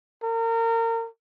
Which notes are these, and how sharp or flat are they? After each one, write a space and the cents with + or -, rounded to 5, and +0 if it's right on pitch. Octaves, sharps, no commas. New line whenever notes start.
A#4 -30